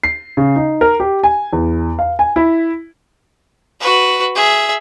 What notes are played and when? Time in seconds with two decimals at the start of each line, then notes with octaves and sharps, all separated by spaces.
0.04 C7
0.37 C#3
0.56 D#4
0.81 A#4
1.00 G4
1.23 G#5
1.53 E2
1.99 F5
2.19 G#5
2.36 E4
3.81 F#4 B4
4.35 G#4 E5